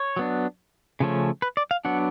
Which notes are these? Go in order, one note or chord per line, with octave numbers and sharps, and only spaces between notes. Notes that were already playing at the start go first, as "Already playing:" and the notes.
Already playing: C#5
F#3 B3 D4
C#3 F3 A3 C#4
B4
D5
F5
F#3 B3 D4 F#5